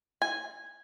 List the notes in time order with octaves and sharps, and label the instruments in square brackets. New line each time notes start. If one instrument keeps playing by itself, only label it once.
[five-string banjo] G#5